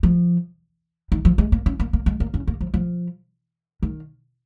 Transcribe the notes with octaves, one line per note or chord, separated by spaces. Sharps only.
F3
D#3
F3
G#3
A#3
C#4
A#3
A#3
G#3
A#3
C#4
A#3
F3
F3
D#3